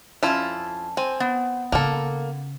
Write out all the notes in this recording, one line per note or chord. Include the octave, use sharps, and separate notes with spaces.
F2 C#4 E4 F4 A5
C4 G#5
B3
C#3 A#3 A4